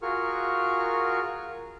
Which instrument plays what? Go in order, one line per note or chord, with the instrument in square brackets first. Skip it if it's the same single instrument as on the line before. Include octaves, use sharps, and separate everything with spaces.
[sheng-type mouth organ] F4 F#4 G#4 A#4 C#6 F6